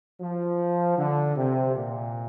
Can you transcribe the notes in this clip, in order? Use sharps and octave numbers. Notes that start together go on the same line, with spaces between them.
F3
D3
C3
A#2